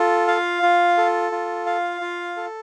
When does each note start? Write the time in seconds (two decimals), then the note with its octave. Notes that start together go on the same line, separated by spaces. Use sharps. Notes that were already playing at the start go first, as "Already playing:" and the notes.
Already playing: F4 A4
0.28 F5
0.63 F4
0.98 A4
1.32 F4
1.66 F5
2.01 F4
2.37 A4